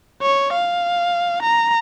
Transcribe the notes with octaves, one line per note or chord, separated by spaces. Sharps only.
C#5
F5
A#5